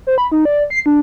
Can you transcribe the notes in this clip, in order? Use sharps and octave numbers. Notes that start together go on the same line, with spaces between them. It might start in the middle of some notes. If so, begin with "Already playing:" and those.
C5
B5
D#4
D5
C7
D4